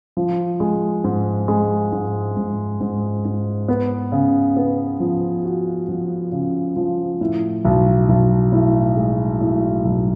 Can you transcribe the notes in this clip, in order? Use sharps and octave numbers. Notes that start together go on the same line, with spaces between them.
F3
G#3
G#2
G#3
G#2
G#2
G#2
G#2
B3
C#3
B3
F3
F#4
F3
C#3
F3
A2
B1
B1
A2
G#3
A2
B1